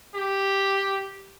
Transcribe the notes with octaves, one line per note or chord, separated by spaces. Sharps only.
G4